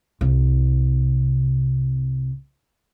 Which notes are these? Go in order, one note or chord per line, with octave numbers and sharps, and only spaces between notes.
C2 C3